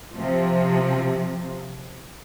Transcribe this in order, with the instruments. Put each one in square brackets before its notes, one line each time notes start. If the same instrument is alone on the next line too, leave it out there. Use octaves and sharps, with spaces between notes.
[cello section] C3 F3